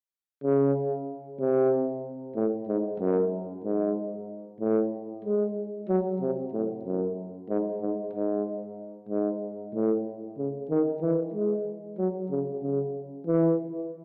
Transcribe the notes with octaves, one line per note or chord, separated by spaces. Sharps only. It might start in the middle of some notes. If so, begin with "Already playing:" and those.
C#3
C3
A2
G#2
F#2
G#2
A2
G#3
F#3
C3
A2
F#2
G#2
G#2
G#2
G#2
A2
C#3
D#3
E3
G#3
F#3
C#3
C#3
E3